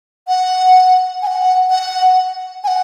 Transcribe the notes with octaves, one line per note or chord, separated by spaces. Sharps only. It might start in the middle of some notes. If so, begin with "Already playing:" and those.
F#5
G#5
F#5
F#5
G#5
F#5